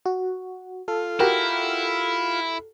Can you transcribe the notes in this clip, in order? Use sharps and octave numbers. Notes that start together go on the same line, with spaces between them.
F#4
F4 A4
E4 F#4 G4 A#4